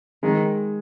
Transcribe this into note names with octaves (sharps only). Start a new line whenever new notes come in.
D#3 G#3